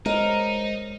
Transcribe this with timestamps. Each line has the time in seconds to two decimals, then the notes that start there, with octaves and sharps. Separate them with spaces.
0.06 G#3 D#4 A#4 C5 C#5 D#5